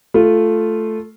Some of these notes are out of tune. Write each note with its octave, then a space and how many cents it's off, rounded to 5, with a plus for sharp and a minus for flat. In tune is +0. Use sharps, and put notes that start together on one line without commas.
A3 -5 F4 -5